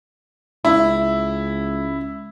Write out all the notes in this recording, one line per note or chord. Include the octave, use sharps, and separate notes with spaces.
C#2 E4